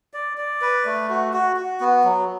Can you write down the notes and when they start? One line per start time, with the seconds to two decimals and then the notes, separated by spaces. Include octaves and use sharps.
0.14 D5
0.38 D5
0.61 B4
0.86 A3
1.10 F#4
1.33 F#4
1.57 F#4
1.80 B3
2.04 F#3